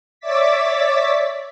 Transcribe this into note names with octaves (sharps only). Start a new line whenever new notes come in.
C#5 D5 E5 D6 A6 B6